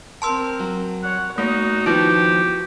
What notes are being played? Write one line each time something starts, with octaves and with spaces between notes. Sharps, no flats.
C4 A#4 A5 C6 E6
F#3
C#5 F#5
A3 A#3 D#4 F#4
D#3 F3 B3 E4 G4